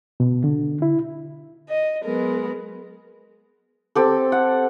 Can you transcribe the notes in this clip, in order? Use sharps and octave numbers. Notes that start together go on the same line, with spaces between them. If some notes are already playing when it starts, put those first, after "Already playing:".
B2
D3
E4
D#5
F#3 G#3 B3 A#4
C4 G4 A4
F#5